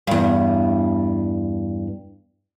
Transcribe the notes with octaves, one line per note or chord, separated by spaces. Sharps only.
E2 G2